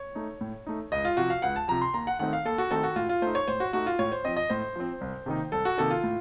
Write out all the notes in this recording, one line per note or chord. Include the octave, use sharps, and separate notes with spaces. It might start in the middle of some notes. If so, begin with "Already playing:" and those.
Already playing: C#5
A3 D#4
A2
A3 D#4
C#2 D#5
F4
C3 F3 F#4
F5
C#2 F#5
A5
C3 F3 A#5
C6
D#2 A#5
F#5
D#3 A3 C4 D#4 F#5
F5
D#2 A4
F#4
D#3 A3 C4 D#4 A4
F#4
A2 F4
F4
A3 D#4 C5
C#5
A2 C5
F#4
A3 D#4 F#4
F4
A2 C#5
C5
F3 C4 D#5
D#5
A2 C5
F3 C4
C2
C3 D#3 A#3 D#4
C2 A4
F#4
C3 D#3 A#3 D#4 A4
F4
A2